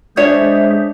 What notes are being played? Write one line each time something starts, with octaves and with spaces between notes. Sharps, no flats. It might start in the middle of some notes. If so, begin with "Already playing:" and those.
G#3 D4 G#4 C5 C#5 E5